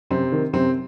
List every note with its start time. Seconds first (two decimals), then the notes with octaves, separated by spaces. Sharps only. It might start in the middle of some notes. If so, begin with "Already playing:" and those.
0.10 F#2 C3 C4
0.32 D#3
0.53 F#2 C3 C4